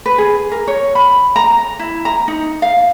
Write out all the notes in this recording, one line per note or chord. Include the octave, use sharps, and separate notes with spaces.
B4
G#4
A#4
C#5
B5
A#5
E4
A#5
D#4
F5